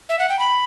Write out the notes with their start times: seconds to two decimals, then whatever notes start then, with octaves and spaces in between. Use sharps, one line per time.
0.09 E5
0.19 F#5
0.29 G5
0.39 B5